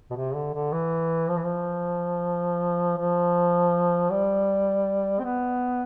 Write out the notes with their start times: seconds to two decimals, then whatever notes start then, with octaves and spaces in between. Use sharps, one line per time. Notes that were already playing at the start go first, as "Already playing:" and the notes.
0.11 B2
0.16 C3
0.35 D3
0.53 D3
0.72 E3
1.29 F3
1.37 E3
1.44 F3
2.98 F3
4.11 G3
5.19 C4
5.24 B3